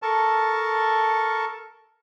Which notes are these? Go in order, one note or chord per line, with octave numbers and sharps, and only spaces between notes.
A4 A#4 A5 C#6